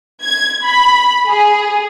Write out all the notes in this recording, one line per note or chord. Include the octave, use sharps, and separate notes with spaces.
G#6
B5
G#4